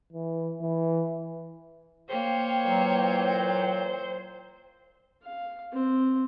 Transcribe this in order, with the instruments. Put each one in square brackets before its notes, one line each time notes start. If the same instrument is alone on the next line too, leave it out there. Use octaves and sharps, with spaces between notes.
[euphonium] E3
E3
[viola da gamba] A#3 C#5 [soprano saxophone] C5 [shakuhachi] G5
[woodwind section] A#2 E3 F#3
[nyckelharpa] F5
C4